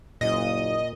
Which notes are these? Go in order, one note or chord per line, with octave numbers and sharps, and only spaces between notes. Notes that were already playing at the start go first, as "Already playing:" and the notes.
F#1 A#2 D#5